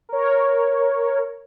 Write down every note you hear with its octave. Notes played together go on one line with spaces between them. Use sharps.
A#4 C#5